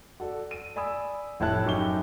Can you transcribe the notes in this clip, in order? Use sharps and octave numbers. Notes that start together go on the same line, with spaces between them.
F#4 A4 D5
D#7
D5 G#5 B5 D#6 E6
F1 A2 E4 C#5 A5 F#6
F#2 D#4 G4 C#6 G7